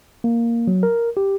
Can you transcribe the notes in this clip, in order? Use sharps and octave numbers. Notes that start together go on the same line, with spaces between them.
A#3
F#3
A#4
G4